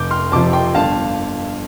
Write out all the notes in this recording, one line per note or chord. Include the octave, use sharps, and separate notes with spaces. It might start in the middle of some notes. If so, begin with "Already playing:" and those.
Already playing: F1 D6 G6
C6 F6
F2 C3 F3 A5 D6
G5 C6
G1 F5 A5